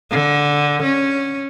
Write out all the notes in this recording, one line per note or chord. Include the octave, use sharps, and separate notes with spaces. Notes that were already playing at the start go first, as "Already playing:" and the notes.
D3
C#4